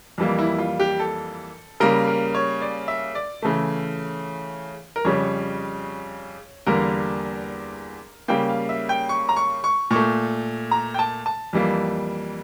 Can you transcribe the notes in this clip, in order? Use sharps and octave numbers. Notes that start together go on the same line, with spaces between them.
F2 E3 G3 A#3
E4
F4
G4
A4
C#3 G3 A#3 A#4
A#4
C#5
D5
E5
D5
C#3 E3 A3
A#4
F2 C#3 G3 C#5
E2 D3 G3 A#3 A#4
C#3 G3 A#3 G5
F5
E5
G5
C#6
A#5
C#6
C#6
A#2 C#6
A3
A#5
G5
A5
A5
F2 E3 G3 A#3